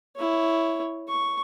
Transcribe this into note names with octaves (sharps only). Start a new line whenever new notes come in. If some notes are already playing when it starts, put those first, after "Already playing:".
E4 C#5
C#6